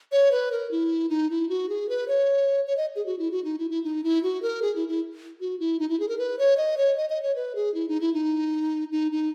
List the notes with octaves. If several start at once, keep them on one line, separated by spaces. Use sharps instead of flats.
C#5
B4
A#4
E4
D#4
E4
F#4
G#4
B4
C#5
C#5
D#5
G#4
F#4
E4
F#4
D#4
E4
E4
D#4
E4
F#4
A#4
G#4
E4
E4
F#4
E4
D#4
E4
G#4
A#4
B4
C#5
D#5
C#5
D#5
D#5
C#5
B4
G#4
E4
D#4
E4
D#4
D#4
D#4